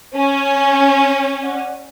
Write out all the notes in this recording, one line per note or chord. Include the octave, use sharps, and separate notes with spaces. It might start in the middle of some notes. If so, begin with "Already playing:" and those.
C#4 G#5
D5 F#5